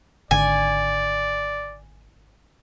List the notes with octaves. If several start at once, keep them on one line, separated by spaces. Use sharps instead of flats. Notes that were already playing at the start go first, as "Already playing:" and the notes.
G#1 D3 D5 G#5